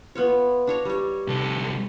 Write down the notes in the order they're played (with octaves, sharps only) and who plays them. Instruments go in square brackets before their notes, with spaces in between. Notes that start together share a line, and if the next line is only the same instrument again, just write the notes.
[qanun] B3 F4 C#5
D4 C#5 A#5
G3 C#5
[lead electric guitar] C2 A4